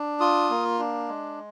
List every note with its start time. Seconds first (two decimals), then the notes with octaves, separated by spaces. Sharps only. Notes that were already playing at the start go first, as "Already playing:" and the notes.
Already playing: D4
0.20 F4 D#6
0.50 A#3
0.79 D4
1.08 G#3